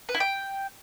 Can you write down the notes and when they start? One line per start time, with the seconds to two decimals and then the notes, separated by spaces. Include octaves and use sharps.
0.09 B4
0.14 E4
0.20 G5